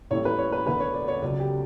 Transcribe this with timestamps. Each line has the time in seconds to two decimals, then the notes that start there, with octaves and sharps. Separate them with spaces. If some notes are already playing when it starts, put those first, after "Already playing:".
0.11 A1 A2 G3 C#5
0.25 B4
0.38 C#5
0.52 B4
0.66 E1 D2 D3 B4
0.80 C#5
0.94 D5
1.08 C#5
1.22 C#2 C#3 F#3 D5
1.40 G4